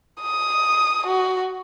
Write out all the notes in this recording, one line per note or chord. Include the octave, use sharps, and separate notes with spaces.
D#6
F#4